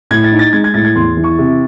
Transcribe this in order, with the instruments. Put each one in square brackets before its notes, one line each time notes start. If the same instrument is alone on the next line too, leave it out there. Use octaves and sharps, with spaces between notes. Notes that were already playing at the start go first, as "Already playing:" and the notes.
[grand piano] A2 G#6
A6
D#4
A6
G#3 G#6
G#6
A2 A6
G#6
E2 C6
E3
C#6
C3